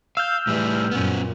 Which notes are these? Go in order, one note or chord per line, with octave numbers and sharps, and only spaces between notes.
F5 E6 F6 G6
A2 E3 G3
F#2 A#2 B3 C#4